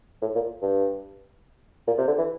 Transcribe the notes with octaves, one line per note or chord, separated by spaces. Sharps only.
A2
A#2
G2
A#2
C3
D3
E3